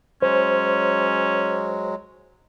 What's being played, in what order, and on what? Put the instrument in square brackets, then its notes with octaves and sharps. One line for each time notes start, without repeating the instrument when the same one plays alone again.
[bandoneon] F#3 G#3 [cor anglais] C#4 [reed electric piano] C5